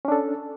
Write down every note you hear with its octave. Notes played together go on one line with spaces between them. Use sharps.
C#4 D4 A4